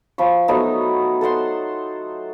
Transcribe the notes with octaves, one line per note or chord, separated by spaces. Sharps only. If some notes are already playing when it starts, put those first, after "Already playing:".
F3 B5 C#6
F#3 A3 B3 D#4
A4 C5 F#5 C6